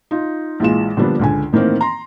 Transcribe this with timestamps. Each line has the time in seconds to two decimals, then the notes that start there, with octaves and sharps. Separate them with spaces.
0.11 D#4 F4
0.60 A#1 E3 G#3 F4 E7
0.97 D3 F3 G3 A#3 B3 D4
1.19 C#2 D3 G#5
1.52 A2 D#3 E3 A#3 C4
1.81 A#5 C6